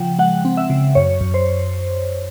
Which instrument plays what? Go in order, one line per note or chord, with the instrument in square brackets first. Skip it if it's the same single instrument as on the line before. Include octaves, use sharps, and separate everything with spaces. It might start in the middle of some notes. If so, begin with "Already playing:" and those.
Already playing: [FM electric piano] C#3 F3 F#5 G5
G#3 F#5
C4
E5
C#3
F#2 C#5
F#2
C5